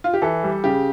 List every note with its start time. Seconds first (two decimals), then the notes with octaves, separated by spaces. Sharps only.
0.04 F4
0.14 G4
0.22 E3 A4
0.43 G3
0.64 C#3 G4